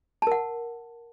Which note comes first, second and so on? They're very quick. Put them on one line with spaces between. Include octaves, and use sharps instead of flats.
A5 A#4 F#5